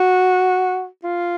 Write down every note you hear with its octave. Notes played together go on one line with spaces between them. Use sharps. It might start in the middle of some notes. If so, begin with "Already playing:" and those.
Already playing: F#4
F4